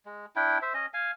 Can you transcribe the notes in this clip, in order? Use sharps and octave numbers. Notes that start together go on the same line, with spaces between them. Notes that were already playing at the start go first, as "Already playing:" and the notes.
G#3
D4 E4 G5
C5 E5
C#4 D#5
F5 G#5